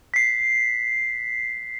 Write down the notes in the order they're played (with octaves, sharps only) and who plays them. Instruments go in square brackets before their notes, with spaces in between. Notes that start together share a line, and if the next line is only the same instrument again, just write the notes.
[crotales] B6 C7